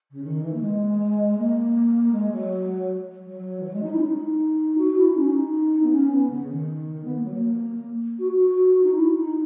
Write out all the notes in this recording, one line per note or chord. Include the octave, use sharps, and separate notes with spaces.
C#3
D#3
E3
A#3
G#3
A#3
G#3
F#3
F#3
E3
F#3
G#3
D#4
E4
C#4
D#4
F#4
E4
D#4
C#4
D#4
B3
C#4
B3
C#3
D#3
B3
A#3
F#3
A#3
F#4
F#4
D#4
E4
D#4